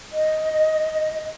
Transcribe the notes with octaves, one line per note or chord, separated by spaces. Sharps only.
D#5